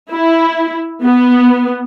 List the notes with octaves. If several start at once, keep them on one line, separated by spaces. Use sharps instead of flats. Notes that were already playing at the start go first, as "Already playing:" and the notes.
E4
B3